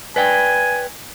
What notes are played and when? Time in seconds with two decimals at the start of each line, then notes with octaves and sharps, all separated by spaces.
0.16 B4 D5 G5 G#5